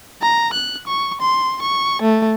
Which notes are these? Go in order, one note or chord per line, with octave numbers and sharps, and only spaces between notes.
A#5
F#6
C#6
C6
C#6
A3